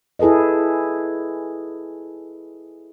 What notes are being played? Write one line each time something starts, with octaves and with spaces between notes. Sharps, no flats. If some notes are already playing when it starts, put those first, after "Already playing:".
E4 G#4 A4 B4 D#5